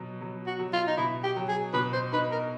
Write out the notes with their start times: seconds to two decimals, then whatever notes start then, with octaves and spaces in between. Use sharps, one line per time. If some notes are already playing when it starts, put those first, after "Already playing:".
Already playing: B2 F#3
0.21 F#3
0.47 F#4
0.59 F#3
0.73 F4
0.87 D#4
0.97 B2 E4
1.23 G4
1.36 F#3
1.48 G#4
1.74 B2 B4
1.93 C5
2.12 D#4 B4
2.32 A#4